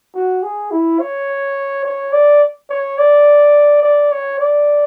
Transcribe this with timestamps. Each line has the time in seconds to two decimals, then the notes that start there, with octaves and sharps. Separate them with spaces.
0.14 F#4
0.43 G#4
0.71 E4
1.00 C#5
1.85 C#5
2.13 D5
2.70 C#5
2.98 D5
3.83 D5
4.12 C#5
4.40 D5